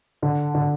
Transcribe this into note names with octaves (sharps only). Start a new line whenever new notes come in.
D3
D3